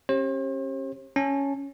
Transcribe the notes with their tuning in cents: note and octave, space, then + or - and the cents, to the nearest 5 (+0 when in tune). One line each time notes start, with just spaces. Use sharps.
C#4 -35 G4 +0 C5 +45
C#4 +0 A5 +0